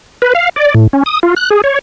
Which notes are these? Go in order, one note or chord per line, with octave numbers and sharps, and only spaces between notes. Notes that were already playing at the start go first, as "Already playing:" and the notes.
B4
F5
D5
A2
C#4
D#6
F4
F#6
G#4
C#5